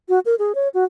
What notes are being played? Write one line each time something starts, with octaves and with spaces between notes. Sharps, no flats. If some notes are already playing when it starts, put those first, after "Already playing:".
F#4
A#4
G#4
C#5
F#4